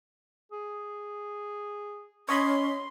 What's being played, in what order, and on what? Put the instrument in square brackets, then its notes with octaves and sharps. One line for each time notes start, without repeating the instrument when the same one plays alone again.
[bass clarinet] G#4
[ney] C#4 [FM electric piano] C#5 D#5 B5 [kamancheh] C6